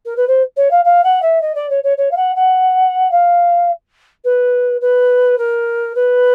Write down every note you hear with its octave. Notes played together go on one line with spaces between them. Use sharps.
A#4
B4
C5
C#5
F5
F5
F#5
E5
D#5
D5
C#5
C#5
C#5
F5
F#5
F#5
F5
B4
B4
A#4
B4